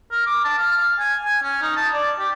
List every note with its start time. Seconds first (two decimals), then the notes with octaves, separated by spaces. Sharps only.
0.11 A#4
0.26 D6
0.45 A5
0.58 F5
0.77 F5
0.99 G#5
1.25 G#5
1.43 C#4
1.62 D#4
1.76 A5
1.93 D5
2.19 G4